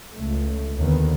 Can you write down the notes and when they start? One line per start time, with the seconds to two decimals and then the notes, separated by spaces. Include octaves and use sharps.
0.14 C#2 A3
0.79 D#2 D3 D#3 B3